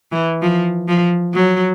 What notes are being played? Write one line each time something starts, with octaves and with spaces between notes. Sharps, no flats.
E3
F3
F3
F#3